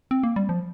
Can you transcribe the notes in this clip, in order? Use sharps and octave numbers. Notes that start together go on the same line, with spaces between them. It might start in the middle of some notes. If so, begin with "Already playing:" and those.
C4
A#3
G3
F3